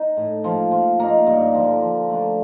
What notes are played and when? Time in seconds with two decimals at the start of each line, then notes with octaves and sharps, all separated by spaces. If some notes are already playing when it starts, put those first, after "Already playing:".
Already playing: D#4
0.17 A2
0.44 F3 A#3
0.71 F3
0.99 A#3 D#4
1.27 G2
1.54 D3 F3
1.82 F3
2.09 A3 D4